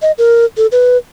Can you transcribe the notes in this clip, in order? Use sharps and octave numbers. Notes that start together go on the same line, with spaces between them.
D#5
A#4
A4
B4